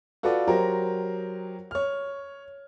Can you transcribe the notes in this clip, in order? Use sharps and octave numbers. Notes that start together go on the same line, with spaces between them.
F4 F#4 A4 B4 D5
F#3 G4 A#4 C5
C#5 F6